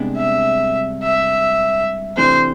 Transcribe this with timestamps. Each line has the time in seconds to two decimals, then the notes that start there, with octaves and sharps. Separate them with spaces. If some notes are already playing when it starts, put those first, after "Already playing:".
Already playing: C2 C3 G#3 B3 D4
0.17 E5
1.03 E5
2.17 C3 E3 A3 D4 C5